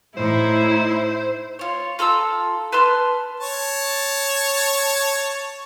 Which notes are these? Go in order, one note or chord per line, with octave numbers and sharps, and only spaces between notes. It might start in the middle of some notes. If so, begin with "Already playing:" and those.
A2 D#4 E4 C5
F4 C#5
F4 A4 A#5 E6
B4 A5 C6 F6
C#5 A5